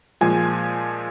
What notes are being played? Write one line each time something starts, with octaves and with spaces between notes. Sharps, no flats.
A#2 F3 G#3 G#5